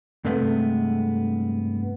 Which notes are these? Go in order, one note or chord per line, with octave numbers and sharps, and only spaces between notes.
G2 C3 G#3 A3 B3